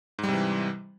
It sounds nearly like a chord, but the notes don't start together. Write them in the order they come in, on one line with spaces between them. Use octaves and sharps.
G#2 G3 C3 E3